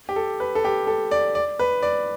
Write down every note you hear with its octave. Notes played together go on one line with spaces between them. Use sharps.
G4
A4
B4
A4
G4
A4
D5
D5
B4
D5